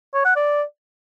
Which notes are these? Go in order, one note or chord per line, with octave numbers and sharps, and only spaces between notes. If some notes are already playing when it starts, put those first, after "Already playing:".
C#5
F#5
D5